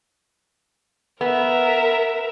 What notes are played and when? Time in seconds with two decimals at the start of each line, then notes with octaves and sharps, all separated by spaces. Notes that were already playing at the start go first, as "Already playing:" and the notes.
1.21 B3 A#4 E5